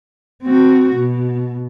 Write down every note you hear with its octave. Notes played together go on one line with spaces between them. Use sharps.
C4 F#4
B2